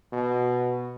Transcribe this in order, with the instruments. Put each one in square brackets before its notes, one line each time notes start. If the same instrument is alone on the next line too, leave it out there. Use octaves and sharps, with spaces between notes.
[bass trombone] B2